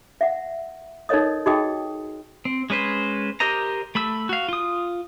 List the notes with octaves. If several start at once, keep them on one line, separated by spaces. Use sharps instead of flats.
E5 F#5
D#4 A4 A#4 C#5 D#5 D#6
D#4 F#4 G#4 D#5 G5 D#6
C4
G#3 C#4 B4 C5
G4 A#4 C5 D#5 A#5
A3 B5 E6
F#4 F5
F4 D#6